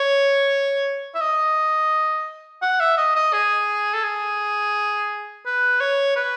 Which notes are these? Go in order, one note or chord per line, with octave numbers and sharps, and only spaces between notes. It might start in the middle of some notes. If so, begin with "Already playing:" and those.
Already playing: C#5
E5
D#5
F#5
E5
D#5
D#5
G#4
A4
G#4
B4
C#5
B4